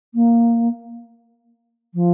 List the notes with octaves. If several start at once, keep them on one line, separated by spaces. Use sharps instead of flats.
A#3
F3